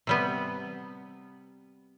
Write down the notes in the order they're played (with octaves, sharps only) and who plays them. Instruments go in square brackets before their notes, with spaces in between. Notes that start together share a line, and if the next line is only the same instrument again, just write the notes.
[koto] C3 G3 B3